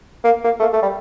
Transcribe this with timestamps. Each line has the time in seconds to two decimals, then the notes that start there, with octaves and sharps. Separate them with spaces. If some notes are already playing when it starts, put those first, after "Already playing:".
0.24 A#3
0.44 A#3
0.60 A3
0.63 A#3
0.73 A3
0.82 G3